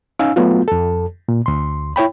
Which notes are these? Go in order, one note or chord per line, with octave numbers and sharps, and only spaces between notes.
C#4 D#4 F5 G#5 E6
F#3 A3 B3 F4 F#4
F2 A4
A#2
D2 C6
E4 C#5 G5 B5